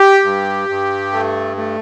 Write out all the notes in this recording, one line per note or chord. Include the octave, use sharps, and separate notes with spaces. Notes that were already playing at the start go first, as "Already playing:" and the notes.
Already playing: G4
G2
G2
A3
A3